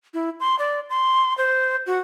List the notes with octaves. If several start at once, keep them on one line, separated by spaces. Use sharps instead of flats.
E4
C6
D5
C6
C5
F#4